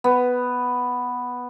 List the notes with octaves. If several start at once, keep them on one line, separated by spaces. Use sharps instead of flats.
B3